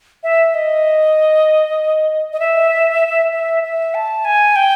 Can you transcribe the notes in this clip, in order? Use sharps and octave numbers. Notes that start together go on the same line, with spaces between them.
E5
D#5
D#5
E5
E5
E5
A5
G#5
G5